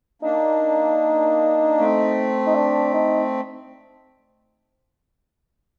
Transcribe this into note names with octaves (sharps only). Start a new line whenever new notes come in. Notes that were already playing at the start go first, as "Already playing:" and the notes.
A#3 D4 D#4
A3 C4
D#4
D4
D#4